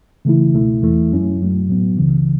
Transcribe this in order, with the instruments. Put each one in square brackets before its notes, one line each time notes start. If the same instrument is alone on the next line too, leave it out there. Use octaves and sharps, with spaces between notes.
[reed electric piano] C#3 E3 A3 E4
C#2 B2 A3 E4
E2 E3 A3 E4
F#2 F#3 C#4 E4
F#2 F#3 A3
A2 F#3 B3
C#2 C#3 E3